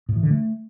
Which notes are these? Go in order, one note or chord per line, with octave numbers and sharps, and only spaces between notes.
A2
E3
D3
A3